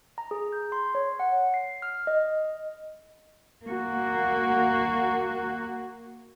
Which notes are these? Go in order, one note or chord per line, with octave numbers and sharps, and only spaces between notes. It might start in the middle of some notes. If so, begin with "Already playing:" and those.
A#5
G#4
G6
C6
C#5
F#5
C7
F6
D#5
A#3 F#4